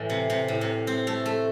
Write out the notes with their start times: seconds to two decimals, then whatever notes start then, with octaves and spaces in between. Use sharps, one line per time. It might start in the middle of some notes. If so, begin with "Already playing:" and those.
Already playing: A2 E3
0.10 C3
0.30 C3
0.48 A2
0.61 C3
0.87 C4
1.07 A3
1.26 A3